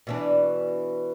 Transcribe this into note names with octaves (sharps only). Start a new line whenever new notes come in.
B2 E3 D4